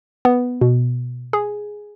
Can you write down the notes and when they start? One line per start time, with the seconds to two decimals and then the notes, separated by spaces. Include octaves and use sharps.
0.25 B3
0.61 B2
1.33 G#4